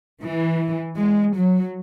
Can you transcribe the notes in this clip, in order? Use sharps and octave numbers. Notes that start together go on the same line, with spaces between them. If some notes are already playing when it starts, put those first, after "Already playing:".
E3
G#3
F#3